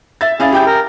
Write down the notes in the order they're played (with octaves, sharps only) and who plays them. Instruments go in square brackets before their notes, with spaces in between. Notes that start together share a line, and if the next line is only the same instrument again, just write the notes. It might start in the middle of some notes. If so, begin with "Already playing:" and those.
[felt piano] E5 A6
[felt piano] C#4 F5 A6 [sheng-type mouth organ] E4 G#4
[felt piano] G4 G5 G6
[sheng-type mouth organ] A#4